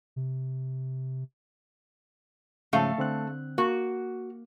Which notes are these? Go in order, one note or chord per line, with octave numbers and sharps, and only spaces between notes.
C3
G#2 C#3 F3 A3 A4 F5
D3 C4 F#6
A#3 F#4